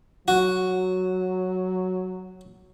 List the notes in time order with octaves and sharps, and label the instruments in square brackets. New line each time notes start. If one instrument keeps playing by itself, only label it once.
[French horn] F#3 [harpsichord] F#4